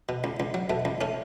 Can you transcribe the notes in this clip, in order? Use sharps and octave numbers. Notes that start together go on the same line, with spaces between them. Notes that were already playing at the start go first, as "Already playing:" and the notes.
B2
C#2
C#2
F#3
B2 A3
C#2
A3 C#4